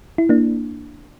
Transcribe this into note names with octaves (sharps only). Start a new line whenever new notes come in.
E4
A#3 D4